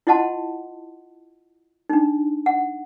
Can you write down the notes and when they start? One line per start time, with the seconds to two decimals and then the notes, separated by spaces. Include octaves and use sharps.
0.07 E4 F4 D#5 F#5 A5 C6
1.89 D4 D#4
2.46 F#5